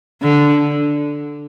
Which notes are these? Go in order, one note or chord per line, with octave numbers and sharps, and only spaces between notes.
D3